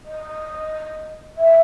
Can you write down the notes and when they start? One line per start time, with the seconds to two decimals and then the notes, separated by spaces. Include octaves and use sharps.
0.05 D#5
1.37 E5